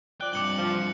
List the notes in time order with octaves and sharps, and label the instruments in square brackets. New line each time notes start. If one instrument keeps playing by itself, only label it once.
[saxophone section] F3 D5 [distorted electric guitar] G5 [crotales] F#6
[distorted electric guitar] C2 G2 [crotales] D6 C#7 F#7
[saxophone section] F3